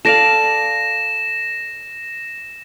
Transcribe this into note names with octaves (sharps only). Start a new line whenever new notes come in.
A4 D5 F5 A#6 E7